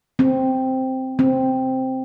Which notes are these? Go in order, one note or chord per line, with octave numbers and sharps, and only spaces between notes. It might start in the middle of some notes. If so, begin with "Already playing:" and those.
C4
C4